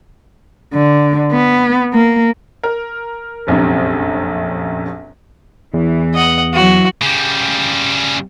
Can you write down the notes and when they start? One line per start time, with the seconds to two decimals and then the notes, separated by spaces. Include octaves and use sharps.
0.74 D3
1.32 B3
1.93 A#3
2.63 A#4
3.47 F1 A#1 F#2 C3
5.74 E2 E3
6.14 D#5 F#5
6.53 E3 F#3 F#4
7.02 C#3 G3